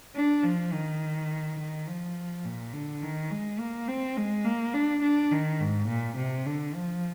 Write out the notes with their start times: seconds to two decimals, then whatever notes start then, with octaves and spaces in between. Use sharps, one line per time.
0.15 D4
0.43 F3
0.72 D#3
1.59 D#3
1.87 F3
2.44 A#2
2.73 D3
3.02 D#3
3.30 G#3
3.59 A#3
3.88 C4
4.17 G#3
4.44 A#3
4.73 D4
5.02 D4
5.31 D#3
5.60 G#2
5.88 A#2
6.17 C3
6.46 D3
6.74 F3